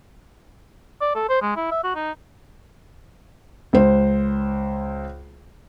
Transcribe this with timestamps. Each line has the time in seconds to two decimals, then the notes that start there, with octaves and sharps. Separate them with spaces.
1.01 D5
1.15 A4
1.29 C5
1.42 G#3
1.57 E4
1.71 E5
1.84 F#4
1.95 D#4
3.73 C#2 C5